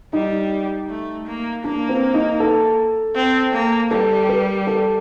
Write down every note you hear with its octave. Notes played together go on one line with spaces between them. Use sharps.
G3 D#4
A3
A#3
A#3 D4
C4
D#4
A4
C4
A#3
G3 A4
A#4
A4